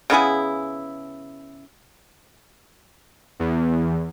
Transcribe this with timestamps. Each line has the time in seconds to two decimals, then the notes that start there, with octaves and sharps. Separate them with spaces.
0.10 C#3 B3 E4 G#4
3.39 E2